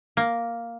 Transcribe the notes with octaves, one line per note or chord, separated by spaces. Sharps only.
A#3